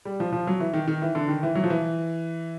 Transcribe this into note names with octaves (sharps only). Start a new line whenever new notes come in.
G3
F3
F3
F#3
E3
D#3
D#3
E3
D3
D#3
E3
F#3
F3
E3